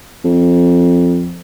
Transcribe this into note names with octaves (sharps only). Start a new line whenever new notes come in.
F2